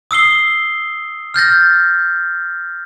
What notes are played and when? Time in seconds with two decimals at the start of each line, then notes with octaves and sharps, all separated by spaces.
0.11 D#6 E6 C7 G7
1.34 F6 G6 A6 A#6